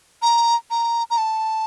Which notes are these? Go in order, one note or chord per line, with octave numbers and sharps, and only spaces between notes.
A#5
A#5
A#5
A5